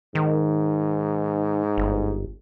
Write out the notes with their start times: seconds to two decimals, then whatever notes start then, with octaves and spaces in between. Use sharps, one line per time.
0.15 G#2 D#3
1.78 G1